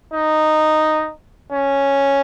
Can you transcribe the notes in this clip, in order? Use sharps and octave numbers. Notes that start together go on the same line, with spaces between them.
D#4
C#4